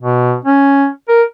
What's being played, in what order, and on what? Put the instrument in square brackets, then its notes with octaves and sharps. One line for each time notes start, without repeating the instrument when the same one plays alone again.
[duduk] B2
C#4
A#4